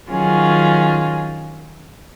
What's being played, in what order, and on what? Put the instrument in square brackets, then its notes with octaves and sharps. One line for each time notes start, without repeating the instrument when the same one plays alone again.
[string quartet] D#3 F#3 C#4 F4 G#4